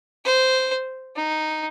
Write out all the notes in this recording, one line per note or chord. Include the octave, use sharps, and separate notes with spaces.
C5
D#4